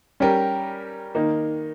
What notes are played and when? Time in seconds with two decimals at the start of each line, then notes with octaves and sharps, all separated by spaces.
0.20 G3 C#4 G4 A#4
1.15 D#3 A#3 D#4